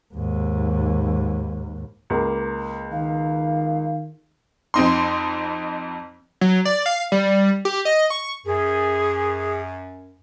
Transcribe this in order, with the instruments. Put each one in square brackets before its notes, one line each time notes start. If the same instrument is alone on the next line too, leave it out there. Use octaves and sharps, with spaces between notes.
[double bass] D#2 G#2
[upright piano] C#2 A#3
[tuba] D#3 [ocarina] F5
[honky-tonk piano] F2 C4 D#4 C6
[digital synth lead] F#3
D5
F5
G3
G4
D#5
C#6
[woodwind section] F#2 [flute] G#4